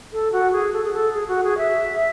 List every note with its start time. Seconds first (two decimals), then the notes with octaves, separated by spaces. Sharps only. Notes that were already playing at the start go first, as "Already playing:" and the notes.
0.13 A4
0.33 F#4
0.52 G#4
0.73 A4
0.84 G#4
0.93 A4
1.13 G#4
1.28 F#4
1.44 G#4
1.58 E5